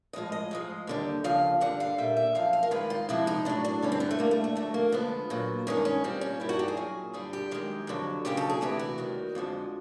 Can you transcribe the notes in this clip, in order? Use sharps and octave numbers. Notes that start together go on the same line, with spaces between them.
A2 F3 G#3 D#5
D#5
G#2 F3 G#3
D#2 D3 G3
D#2 C#3 F3 F5
G2 D3 G3 F#5
F5
A#2 G3 E5
E5
F#2 C#3 F3 F5
F5
A#4
G2 D#3 G#3 B4
F4
F2 C3 F3 G#3 E4
D#4
A2 F#3 D4
D4
G2 D3 G3 C#4
C4
B3
A3
G2 D3 G3 A#3
A3
A3
F2 D3 F#3 A3
A#3
F2 D3 F3 G#3 B3
A#2 F#3
G2 D#3 G#3 C#4
C#4
A#2 G3 C4
C#4
G2 D#3 G3 E4
F#4
G4
G#4
A#2 F#3
G2 D3 G3 G#4
G4
F#2 D#3 G#3
F2 D3 F#3
D#2 C#3 F#3 G4
A4
G#4
D2 C3 E3 G4
F#4
D#2 D#3 G3
F2 D3 F3 G#3